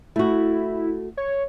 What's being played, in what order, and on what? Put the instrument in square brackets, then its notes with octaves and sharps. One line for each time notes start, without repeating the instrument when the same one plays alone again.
[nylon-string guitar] A3 F#4 [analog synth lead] E4
[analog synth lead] C#5